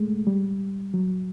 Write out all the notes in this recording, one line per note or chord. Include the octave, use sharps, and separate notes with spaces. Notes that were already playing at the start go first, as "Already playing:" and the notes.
Already playing: G#3 A3
G3
F#3